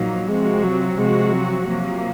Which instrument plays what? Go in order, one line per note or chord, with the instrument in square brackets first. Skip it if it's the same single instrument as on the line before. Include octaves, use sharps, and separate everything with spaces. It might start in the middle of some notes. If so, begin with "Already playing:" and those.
Already playing: [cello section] A#2 F3 A#3 D#4 [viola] F#3
[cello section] C3 F3 C4 F#4 [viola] G#3
[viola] F#3
[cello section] C3 F3 C4 F#4 [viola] G#3
[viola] F#3
[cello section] C3 F3 A#3 [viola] F#3